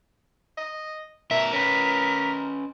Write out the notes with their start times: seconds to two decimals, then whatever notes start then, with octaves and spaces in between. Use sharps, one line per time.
0.58 D#5
1.31 B2 A#4 E5
1.53 C#4 A#4 B4 B6